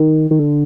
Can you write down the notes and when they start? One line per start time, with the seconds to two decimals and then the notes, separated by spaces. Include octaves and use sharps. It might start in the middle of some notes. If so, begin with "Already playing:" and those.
Already playing: D#3
0.31 D#3
0.39 D3